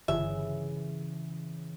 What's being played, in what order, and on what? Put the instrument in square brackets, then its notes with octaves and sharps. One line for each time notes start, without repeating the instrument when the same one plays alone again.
[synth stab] G1 [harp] C#3 E3 [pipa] E5